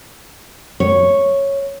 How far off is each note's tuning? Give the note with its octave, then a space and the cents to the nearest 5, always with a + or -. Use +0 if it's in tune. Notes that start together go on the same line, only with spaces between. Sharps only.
C#5 -5